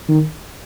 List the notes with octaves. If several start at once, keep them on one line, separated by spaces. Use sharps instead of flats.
D#3